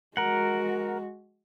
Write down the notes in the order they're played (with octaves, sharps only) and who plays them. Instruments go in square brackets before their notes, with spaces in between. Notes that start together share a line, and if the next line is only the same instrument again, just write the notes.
[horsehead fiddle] G#3 F#4 [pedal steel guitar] A#4 F#5